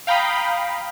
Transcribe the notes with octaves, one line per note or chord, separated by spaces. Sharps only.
F5 G5 A#5 B5 D#6